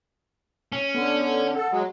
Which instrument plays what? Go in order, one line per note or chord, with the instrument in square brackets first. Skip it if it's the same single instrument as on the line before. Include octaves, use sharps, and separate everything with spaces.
[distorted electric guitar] C#4
[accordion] D3 [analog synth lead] B3
[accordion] A4 [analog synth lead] F#5
[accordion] F#3 G#3